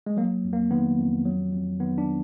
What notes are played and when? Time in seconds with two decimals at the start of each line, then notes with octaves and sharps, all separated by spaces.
0.06 G#3
0.17 F#3 A#3
0.44 F2
0.53 A#3
0.71 D#3 B3
0.98 F2
1.25 F#3
1.52 F2
1.80 D#3 B3
1.98 D4